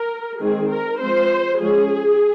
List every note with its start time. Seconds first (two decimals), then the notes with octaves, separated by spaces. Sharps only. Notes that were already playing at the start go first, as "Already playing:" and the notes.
Already playing: A#4
0.41 D#3 G#3 C4 G#4
0.71 A#4
1.00 F3 G#3 C4 C5
1.60 F3 G#3 C#4 G#4